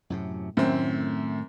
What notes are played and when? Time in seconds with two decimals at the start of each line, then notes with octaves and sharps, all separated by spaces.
0.10 F#2 A2 C3
0.57 F#2 A2 D#3 A3 C4